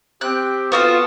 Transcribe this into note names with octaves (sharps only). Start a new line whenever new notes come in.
C4 G4 F#6
B3 F4 F#4 A4